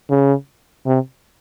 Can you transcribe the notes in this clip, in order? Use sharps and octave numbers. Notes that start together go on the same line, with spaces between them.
C#3
C3